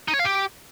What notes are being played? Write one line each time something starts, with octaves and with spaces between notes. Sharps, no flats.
D#4
C#5
F5
G4